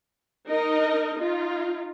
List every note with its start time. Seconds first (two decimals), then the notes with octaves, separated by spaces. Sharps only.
0.48 D#4 A#4 D#5
1.18 D#4 F4